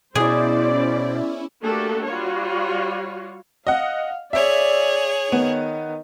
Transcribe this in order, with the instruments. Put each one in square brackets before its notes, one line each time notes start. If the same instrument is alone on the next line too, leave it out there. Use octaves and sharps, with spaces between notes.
[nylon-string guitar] B2 [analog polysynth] C#4 E4 [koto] G#4 [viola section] C5 D5
[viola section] A3 A#3 D4 F#4 G4 A4
G3 F4 F#4 C#5
[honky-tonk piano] D#5 F#5 [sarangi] F5
[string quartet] G#4 C#5 [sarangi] D5 [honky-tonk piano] E5
[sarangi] D#3 [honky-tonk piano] B3